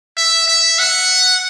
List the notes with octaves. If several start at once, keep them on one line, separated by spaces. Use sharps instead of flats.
E5
E5
F#5